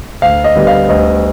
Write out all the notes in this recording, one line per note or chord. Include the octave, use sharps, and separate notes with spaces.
D2 F5
D#5
D3 G3 B3
F5
D2 D#5